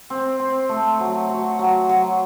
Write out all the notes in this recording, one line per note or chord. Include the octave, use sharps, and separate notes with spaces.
C4
C4
A3
F#3
F#3
F#3
F#3